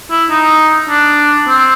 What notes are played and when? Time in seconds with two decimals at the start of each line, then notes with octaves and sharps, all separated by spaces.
0.10 E4
0.30 D#4
0.89 D4
1.49 C4